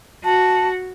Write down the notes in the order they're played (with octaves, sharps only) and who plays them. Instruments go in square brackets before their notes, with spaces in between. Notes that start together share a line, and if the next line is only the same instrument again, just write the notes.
[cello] F#4 [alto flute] A5